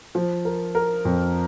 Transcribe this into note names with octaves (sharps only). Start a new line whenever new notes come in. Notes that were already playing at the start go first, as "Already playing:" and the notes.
F3
A#4
A#4
F2